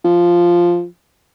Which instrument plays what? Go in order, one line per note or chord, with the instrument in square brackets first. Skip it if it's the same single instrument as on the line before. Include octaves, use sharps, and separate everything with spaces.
[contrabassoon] F3